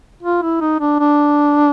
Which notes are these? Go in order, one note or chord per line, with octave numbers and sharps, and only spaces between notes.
F4
E4
D#4
D4
D4